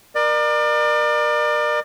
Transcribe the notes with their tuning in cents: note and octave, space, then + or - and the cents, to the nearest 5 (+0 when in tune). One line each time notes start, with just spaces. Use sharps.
A#4 +20 D5 +35